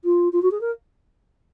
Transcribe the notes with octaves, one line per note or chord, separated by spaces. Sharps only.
F4
F4
F#4
G#4
A#4